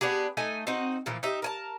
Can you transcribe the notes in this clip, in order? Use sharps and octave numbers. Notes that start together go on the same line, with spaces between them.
B3 D4 G4 G#4
A3 D#4 D#5 G#5
C4 D#4 F#4 D#5
A#2 E3 F3
D#4 G4 E5
A#4 G#5 A5